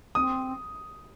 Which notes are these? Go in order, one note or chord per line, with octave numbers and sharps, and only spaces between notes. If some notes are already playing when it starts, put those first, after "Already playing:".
C4 D#6